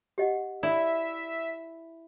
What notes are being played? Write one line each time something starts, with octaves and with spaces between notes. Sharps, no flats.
G4 D#5 F#5
E4 D5 E5